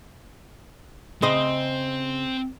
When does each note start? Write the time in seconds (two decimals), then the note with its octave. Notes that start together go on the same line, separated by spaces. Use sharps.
1.22 C#3 C4 C5 D#5